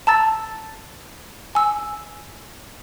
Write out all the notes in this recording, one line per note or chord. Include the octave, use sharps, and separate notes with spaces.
A5 A#5 E6 A6
G#5 E6